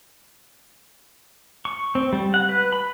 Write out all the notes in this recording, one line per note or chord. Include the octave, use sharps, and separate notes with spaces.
C#6
C4
G3
F#5
B4
B5